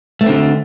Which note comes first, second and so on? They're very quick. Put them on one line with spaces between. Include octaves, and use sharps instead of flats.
A3 B3 C4 D3